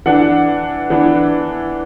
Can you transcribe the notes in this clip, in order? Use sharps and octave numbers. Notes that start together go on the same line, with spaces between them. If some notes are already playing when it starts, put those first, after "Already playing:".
E3 D4 F#5
E3 B3 D4